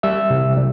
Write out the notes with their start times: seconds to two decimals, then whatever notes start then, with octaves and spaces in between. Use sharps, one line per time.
0.03 G3 E5 E6
0.30 C3
0.57 G3